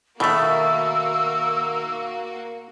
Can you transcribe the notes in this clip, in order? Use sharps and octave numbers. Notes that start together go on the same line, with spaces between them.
B2 D#3 A3 A#3 F#4 E5 E6